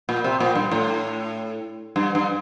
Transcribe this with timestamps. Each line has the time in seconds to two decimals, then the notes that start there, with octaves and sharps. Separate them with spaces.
0.09 A#2
0.24 C3
0.40 A#2
0.55 G2
0.71 A2
1.96 G2
2.15 G2